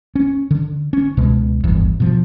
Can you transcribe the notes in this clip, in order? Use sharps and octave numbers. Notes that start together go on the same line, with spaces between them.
C#4
D3
C#4
C#2 B2 G#3
D1 G1 E2
B2 F3